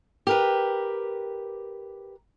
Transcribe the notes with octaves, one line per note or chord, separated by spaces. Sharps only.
G4 A#4 B4